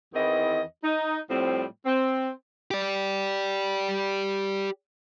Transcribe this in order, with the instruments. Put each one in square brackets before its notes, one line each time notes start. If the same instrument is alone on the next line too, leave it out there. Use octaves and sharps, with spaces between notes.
[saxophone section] E2 D#3 E3 C4 D#5
D#4
A2 F3 G3 C4
C4
[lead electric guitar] G4 D5